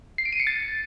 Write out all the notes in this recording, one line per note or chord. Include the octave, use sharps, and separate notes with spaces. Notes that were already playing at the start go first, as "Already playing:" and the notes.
C7
D7
D#7
C#7
A6